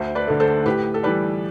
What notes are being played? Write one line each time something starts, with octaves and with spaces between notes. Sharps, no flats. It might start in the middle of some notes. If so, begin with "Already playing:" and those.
Already playing: D2 C5 E5
B4 D5
D3 A3
A4 C5
A2 G4 B4
A4
E3 G3 G4 B4